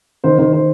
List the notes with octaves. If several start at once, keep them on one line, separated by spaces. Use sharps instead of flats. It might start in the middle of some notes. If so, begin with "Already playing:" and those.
D#3 C5
D#3 C5
D#3 C5